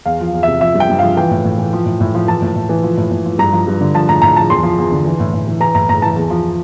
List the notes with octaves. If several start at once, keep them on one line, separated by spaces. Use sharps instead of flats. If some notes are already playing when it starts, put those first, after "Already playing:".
E2 F5
F3
E2
C3 E5
F3 E5
G2
G5
G2
F3 F5
E3 G5
A2
A2
E3
F3
A2
A2
F3
E3 A5
A2
A2
E3
F3
A2
A2
F3
G2 A#5
F3
G2
D3
F3 A5
A2 A#5
A2 A#5
F3 A5
E2 C6
F3
E2
D3
E3
A2
A2
E3
E3 A#5
A2 A#5
A2 A#5
E3 A5
E2
F3